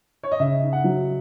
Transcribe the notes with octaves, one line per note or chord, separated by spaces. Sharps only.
C#5
D#5
C#3 E5
D#4
F#5
F#3